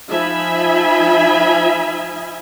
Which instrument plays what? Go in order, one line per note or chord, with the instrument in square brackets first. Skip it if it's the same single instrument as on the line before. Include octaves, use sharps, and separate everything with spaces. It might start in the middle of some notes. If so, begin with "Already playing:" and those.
[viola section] F3 D#4 E5 G#5 B5